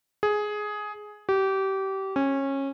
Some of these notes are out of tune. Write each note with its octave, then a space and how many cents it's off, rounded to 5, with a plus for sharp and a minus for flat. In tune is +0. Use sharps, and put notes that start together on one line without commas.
G#4 +10
G4 -25
C#4 -20